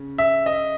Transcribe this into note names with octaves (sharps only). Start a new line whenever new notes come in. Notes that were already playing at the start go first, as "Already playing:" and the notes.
Already playing: C#3
E5
D#5